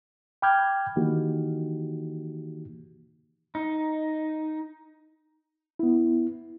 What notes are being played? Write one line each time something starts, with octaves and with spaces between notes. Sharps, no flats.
G5 B5 D6 F6 G6 G#6
D#3 E3 A#3 D#4 F#4 G4
D#4
B3 E4